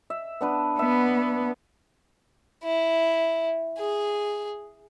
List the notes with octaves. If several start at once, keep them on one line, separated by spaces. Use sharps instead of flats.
E5
B3 D4 B4
B3 E5
E4
G#4